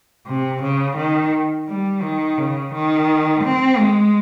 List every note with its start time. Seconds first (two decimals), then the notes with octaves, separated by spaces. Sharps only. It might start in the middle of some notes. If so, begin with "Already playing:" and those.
0.27 C3
0.63 C#3
0.97 D#3
1.68 G3
2.03 D#3
2.38 C#3
2.74 D#3
3.44 C4
3.79 G#3